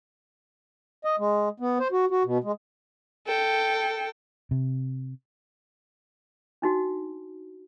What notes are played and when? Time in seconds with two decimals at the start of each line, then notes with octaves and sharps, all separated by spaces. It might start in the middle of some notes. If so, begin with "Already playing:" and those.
1.05 D#5
1.19 G#3
1.60 B3
1.80 C5
1.92 F#4
2.11 F#4
2.25 B2
2.44 G#3
3.27 A4 G5
4.51 C3
6.62 D4 D#4 F#4